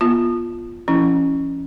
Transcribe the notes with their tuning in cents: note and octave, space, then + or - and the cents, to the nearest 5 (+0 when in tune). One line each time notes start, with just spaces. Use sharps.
B3 -30 F4 +0
F3 -35 C#4 +0 E4 +0